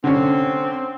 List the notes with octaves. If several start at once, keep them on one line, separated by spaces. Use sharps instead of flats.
D3 C4 C#4